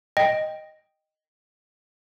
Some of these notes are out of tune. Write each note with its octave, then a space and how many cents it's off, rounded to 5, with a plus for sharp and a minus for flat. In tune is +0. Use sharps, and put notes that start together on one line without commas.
D#5 +0 G5 +0